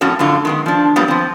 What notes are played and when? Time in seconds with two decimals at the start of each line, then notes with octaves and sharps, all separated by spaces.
0.01 F2 A2 C#4 F#4 C#5
0.19 F#2 A2 D3 F4
0.45 D#3 G#3 B3
0.66 F3 D4
0.96 F#3 G3 A#3 B3 F4
1.08 F3 C4